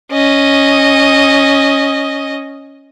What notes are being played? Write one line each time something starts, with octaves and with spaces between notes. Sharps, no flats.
C#4 D#5